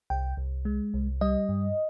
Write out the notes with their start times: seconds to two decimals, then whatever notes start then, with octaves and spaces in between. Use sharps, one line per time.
0.10 C2 G5
0.37 C2
0.65 G#3
0.94 C2
1.21 G3 D#5
1.49 G2